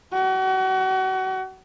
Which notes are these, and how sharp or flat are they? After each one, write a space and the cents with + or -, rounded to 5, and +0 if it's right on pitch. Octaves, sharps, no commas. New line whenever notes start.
F#4 +35